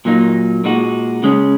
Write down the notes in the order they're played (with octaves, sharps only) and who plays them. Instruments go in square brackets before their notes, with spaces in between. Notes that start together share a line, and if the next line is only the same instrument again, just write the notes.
[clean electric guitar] A#2 F#3 A#3 D#4
A#2 G#3 D#4 F#4
C#3 G#3 C#4